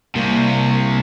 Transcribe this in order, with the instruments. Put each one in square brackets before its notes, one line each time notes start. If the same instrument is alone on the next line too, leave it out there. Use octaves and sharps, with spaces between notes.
[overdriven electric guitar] C2 C3 [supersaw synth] A#3 C#6